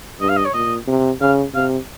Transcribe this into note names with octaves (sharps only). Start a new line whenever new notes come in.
G2 D#5
F5
D#5
C#5
A#2 D#5
C3
C#3 F5
C3 F5